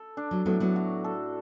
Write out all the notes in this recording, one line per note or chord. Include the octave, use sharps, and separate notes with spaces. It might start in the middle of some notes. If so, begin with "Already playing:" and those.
Already playing: A4
D4
F#3
A2 F#3 B3
F#3 B3
F#4
A4